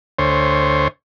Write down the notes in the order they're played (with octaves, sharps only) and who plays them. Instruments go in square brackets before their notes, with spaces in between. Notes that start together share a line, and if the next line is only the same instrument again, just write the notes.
[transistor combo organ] D2 C5 C#5